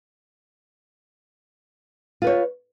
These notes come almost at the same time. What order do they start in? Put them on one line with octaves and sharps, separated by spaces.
F4 B4 C#5